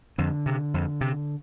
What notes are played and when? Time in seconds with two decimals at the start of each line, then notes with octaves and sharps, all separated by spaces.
0.18 F2 D3
0.46 C3
0.74 F2
1.01 C3